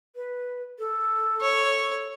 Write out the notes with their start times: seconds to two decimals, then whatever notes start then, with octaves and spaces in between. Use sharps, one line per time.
0.16 B4
0.79 A4
1.41 C#5